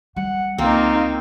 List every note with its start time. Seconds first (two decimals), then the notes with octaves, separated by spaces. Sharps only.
0.16 G3 F#5
0.58 C#2 A#3 C4 D#4 F4